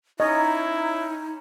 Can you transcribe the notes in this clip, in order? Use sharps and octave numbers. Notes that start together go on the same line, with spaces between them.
C#4 D#4 E4 C#5 D#5 A#5